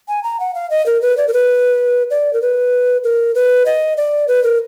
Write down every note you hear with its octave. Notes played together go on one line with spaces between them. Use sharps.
G#5
A#5
F#5
F5
D#5
A#4
B4
D5
A#4
B4
D5
A#4
B4
A#4
B4
D#5
D5
B4
A#4